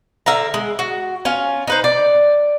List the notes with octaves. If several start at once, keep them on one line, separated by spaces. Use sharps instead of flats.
D3 E5 F5 A#5
G#3
F#4
C#4 F4
D#4 B4 C5
D5